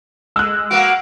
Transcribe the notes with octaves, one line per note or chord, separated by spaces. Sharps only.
G#3 E6 F#6
A#3 B3 F#4 F5 D7